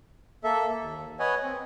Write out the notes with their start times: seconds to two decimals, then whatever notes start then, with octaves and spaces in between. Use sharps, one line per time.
0.44 A#3 A4 E5
0.80 D#2
1.19 B4 C#5 D#5 F#5 G#5
1.43 C4